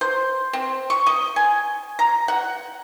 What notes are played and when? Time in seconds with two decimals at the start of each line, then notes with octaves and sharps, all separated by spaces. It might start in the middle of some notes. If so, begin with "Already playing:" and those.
0.01 C5
0.53 C4
0.90 C#6
1.07 D#5
1.36 G#5
1.99 A#5
2.28 F#5